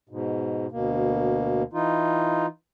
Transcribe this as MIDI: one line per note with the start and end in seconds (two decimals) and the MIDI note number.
0.09 0.67 44
0.09 0.67 47
0.72 1.63 38
0.72 1.63 47
0.72 1.63 58
1.73 2.46 52
1.73 2.46 63
1.73 2.46 65